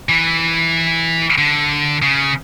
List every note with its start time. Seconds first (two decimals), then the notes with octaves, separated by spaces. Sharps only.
0.09 E3
1.38 D3
2.02 C#3